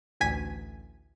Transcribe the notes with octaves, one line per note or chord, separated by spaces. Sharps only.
A1 D2 G#5 B6 D#7